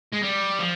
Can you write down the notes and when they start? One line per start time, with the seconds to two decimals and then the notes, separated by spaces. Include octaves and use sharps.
0.12 G#3
0.23 G3
0.59 F3